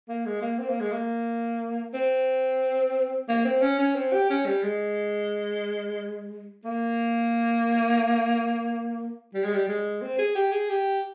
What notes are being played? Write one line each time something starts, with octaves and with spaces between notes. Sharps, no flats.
A#3
G#3
A#3
C4
A#3
G#3
A#3
C4
A#3
C4
C#4
C#4
C4
G4
C#4
G3
G#3
A#3
G3
G#3
G3
G#3
C4
G#4
G4
G#4
G4